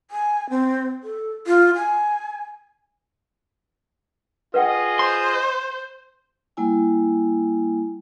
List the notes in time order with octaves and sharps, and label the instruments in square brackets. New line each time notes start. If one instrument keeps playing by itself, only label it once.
[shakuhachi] G#5
C4
A4
F4
G#5
[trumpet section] F4 G#4 D#5 [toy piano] B4 F#5 G5
[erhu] C5 [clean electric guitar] C6
[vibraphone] G3 A#3 E4 G#5